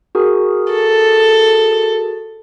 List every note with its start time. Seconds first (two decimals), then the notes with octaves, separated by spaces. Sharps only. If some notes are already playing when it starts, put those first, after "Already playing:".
0.15 F#4 G#4 A#4
0.72 A4